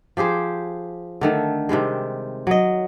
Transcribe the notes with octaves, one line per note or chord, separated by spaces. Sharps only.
F3 G4 G#4 C5
D3 D#3 A3
C3 D#3 G3 G#3
F#3 D#5